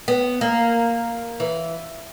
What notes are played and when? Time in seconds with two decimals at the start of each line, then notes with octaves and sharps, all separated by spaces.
0.08 B3
0.41 A#3
1.40 E3